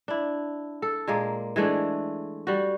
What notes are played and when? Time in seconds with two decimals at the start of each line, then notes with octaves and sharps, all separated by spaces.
0.08 D4 E4
0.82 A4
1.08 A#2 G#3 A#3
1.56 E3 G#3 A3 D4
2.47 G3 F#4